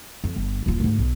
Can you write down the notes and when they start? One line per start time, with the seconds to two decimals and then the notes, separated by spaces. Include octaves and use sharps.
0.24 F2
0.36 G1
0.66 D#1 F4
0.80 D2 G#2
0.99 B1